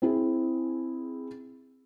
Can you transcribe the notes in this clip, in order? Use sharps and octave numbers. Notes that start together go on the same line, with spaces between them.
C4 E4 G#4